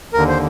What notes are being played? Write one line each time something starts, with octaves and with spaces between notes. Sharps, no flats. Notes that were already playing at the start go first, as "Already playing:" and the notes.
D#2 D3 A#4
C5